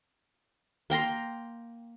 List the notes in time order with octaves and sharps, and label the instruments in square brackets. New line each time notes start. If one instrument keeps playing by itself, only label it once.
[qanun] A#3 G5 A#5 C6